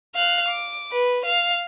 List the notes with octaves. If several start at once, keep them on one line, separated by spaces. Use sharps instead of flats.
F5 F#6
D6
B4
F5